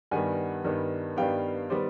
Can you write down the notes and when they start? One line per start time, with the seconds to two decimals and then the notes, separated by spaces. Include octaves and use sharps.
0.11 G2 D#3 G3 B3 F#5 G#5
0.64 G2 D#3 G3 B3
1.17 G2 D#3 G3 B3 F5 G5
1.70 D#3 G3 B3 C5 D5